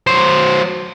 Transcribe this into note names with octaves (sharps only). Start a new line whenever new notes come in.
F#3 C5